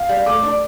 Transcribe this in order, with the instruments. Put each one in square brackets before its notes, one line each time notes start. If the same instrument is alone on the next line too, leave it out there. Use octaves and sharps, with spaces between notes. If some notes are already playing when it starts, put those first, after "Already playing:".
Already playing: [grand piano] F5
[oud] G3
[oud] A3 [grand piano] D6
[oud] D4